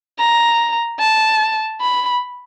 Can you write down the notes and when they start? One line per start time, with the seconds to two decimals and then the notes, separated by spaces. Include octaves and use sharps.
0.19 A#5
1.00 A5
1.81 B5